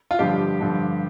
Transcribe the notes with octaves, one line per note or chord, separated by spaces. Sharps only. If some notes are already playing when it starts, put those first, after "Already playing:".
F4
G2 D3 F3 G4
G2 D3 F3